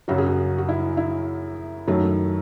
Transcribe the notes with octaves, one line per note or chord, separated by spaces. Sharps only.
F#2 C#3 F#3 F#4
G#4
F#4
F#4
E4
E4
F#2 D#3 F#3 A3